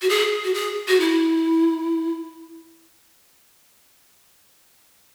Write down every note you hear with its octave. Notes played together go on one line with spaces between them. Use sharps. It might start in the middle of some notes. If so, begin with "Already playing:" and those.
F#4
G#4
F#4
G#4
F#4
E4